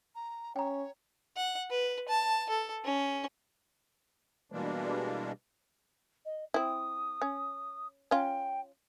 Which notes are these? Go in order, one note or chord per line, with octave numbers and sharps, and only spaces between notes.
A#5
C#4 C#5 G5 A#5
F#5
B4
A5
A4
C#4
B2 E3 G3 G#3 A#3 D4
D#5
C4 E4 D#6
C#4
C#4 F4 G5